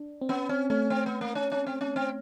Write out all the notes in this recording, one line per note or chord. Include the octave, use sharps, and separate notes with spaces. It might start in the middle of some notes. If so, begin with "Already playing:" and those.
Already playing: D4
C4
B3 C#4
C4 C#4
A3 C#4
C4
B3
A#3
C#4
C#4
C4
C#4
C4